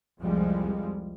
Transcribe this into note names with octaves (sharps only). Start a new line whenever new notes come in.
C2 F2 F3 G3 G#3